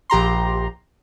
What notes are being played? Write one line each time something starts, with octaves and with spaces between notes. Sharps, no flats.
A#1 G4 A#5 C6